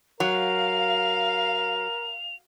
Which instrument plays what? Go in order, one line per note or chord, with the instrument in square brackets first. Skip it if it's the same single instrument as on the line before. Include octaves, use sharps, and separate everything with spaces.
[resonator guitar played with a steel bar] F#3 [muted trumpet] A#4 [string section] F5 [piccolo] F7